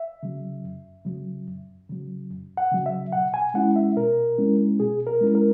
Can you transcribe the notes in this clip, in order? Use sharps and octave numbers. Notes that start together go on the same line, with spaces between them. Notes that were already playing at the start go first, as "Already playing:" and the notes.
Already playing: E5
C#3 F#3
F#2
C#3 F#3
F#2
C#3 F#3
F#2
F#5
C#3 F#3
E5
B2 F#5
G#5
G#3 C#4 E4 F#5
E5
B2 A#4
G#3 C#4 E4
B2 G#4
A#4
G#3 C#4 E4
A#4